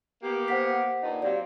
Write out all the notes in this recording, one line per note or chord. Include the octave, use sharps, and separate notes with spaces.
A#3 B3 G4
C5 F#5 B6
G2 A#2 D#4
F#3 C4 G4 D5 F5